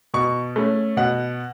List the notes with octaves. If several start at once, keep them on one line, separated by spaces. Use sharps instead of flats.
B2 C#6
A3 C#4
B2 F#5